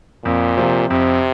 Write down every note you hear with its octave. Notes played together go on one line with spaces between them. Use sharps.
F2 A#2
C3 F3
F2 C3